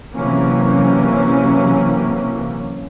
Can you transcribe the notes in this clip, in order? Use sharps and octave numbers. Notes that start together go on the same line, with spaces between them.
C3 E3 F#3 A#3 C#4